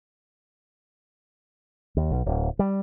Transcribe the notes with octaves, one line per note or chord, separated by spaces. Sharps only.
D#2
B1
D1
G3